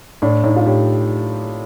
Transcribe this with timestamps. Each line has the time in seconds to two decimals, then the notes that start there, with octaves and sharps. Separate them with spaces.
0.22 A2 D4
0.44 A2 D#4
0.56 F4
0.66 A2 G4